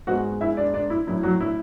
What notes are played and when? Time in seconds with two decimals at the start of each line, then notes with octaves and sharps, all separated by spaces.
0.07 G#2 G#3 B3 F#4 F#5
0.41 E4 E5
0.57 D4 D5
0.74 D4 D5
0.90 E4
1.07 A1 A2 F#3 E4
1.23 F#3 F#4
1.40 E4